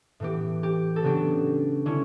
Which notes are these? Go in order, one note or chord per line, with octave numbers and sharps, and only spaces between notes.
A2 E3 B3 G4
G4
A4
C#3 F#3 B3 D4 G4
D3 G3 C#4 E4